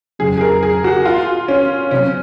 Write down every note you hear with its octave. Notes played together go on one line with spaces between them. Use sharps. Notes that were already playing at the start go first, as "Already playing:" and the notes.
F2 C#3 F#3 C#4 G#4
G#4
A#4
G#4
F#4
F4
C#4
C3 F#3 C4 C#4